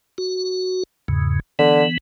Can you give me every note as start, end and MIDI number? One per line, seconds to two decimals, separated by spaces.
0.18 0.83 66
1.08 1.40 40
1.08 1.40 44
1.08 1.40 49
1.59 1.83 50
1.59 1.98 52
1.59 1.98 59